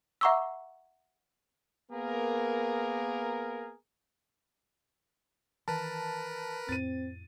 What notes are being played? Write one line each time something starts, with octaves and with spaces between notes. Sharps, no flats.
E5 F#5 A#5 C#6 D6 E6
A#3 B3 G#4 A#4
D#3 E3 A#4 B4 A5
F2 A2 C4 A6 D#7